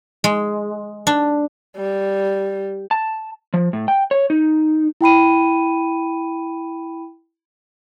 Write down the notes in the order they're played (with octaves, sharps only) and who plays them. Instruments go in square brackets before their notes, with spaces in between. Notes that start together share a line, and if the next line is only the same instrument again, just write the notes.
[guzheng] G#3
D4
[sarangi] G3
[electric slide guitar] A5
F3
A2
G5
C#5
D#4
[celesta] E4 G5 B5 D#7